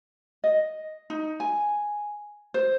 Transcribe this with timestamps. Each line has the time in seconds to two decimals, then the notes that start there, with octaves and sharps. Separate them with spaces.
0.44 D#5
1.10 D#4
1.40 G#5
2.54 C5